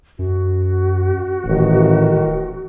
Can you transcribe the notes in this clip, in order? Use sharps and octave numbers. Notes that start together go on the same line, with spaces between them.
F#2 F#4
D#1 A1 D#3